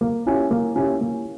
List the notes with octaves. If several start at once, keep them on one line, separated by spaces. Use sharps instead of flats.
A#3
C#4 E4 G4
A#3
C#4 E4 G4
A#3